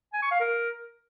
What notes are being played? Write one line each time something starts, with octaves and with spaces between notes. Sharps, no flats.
G#5
C#6
F5
A#4